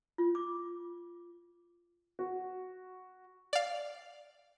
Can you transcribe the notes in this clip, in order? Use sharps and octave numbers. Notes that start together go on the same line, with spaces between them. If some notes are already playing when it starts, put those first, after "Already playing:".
F4
D6
F#4
D5 F5